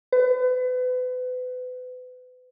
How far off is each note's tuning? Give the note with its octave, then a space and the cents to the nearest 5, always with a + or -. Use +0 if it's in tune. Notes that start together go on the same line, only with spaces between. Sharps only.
B4 +35